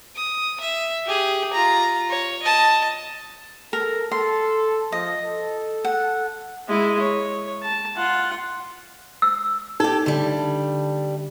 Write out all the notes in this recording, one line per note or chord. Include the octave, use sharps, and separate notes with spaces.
D#6
E5
G4 G#4
F4 A#5
C#5
D#5 A5
A4 A#4
A4 C6
F3 D#5
A4
F#5
G#3 E4
C#5
A5
F4 F#5
E6
D#4 G4 A4
D3 G3 A3